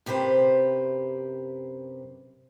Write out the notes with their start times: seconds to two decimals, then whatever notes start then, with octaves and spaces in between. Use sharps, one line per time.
0.06 F#2 C3 G4 B4 C5